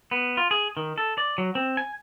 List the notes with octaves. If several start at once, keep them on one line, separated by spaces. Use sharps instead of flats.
B3
F4
G#4
D#3
A4
D5
F#3
C4
G#5